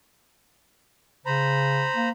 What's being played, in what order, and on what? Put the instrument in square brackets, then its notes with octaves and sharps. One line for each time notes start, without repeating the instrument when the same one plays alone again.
[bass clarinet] C#3 [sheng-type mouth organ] C5 A#5 B5
[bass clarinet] A#3